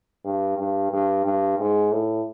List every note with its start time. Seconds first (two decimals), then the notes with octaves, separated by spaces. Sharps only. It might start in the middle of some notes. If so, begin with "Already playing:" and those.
0.25 G2
0.58 G2
0.91 G2
1.25 G2
1.59 G#2
1.92 A2